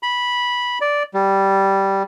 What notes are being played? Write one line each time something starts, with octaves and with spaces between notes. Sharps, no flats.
B5
D5
G3